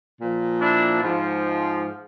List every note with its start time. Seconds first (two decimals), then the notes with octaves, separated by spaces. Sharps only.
0.19 A#2 F3
0.61 D4 E4
1.03 G#2 F3